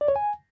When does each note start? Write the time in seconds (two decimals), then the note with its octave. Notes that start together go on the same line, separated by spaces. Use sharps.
0.01 D5
0.08 C#5
0.16 G#5